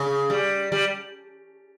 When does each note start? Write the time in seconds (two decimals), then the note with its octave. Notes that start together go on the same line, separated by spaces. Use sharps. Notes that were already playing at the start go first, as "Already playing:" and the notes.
Already playing: C#3
0.30 G3
0.72 G3